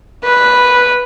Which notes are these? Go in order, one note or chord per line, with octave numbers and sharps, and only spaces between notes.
B4